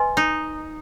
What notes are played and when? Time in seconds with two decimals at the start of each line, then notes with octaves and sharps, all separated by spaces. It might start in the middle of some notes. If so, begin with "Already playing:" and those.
Already playing: B4 D#5 G#5 C6
0.17 D#4